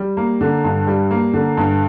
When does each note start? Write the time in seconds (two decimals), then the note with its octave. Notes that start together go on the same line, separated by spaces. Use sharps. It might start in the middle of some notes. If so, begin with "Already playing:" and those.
Already playing: G3
0.17 A#3
0.41 D3
0.64 G2
0.87 G3
1.11 A#3
1.33 D3
1.57 G2